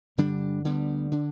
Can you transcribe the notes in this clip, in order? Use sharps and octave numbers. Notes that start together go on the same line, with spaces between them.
G2 D3 G3 D4
D2 D3 G3 B3
D3 B3 D4